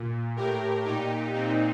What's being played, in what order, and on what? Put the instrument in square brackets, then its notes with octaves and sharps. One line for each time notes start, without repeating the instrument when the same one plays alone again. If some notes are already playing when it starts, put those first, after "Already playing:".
Already playing: [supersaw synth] A#2
A2 G4 A#4
A#2 D#4 G4
A#2 C4 D#4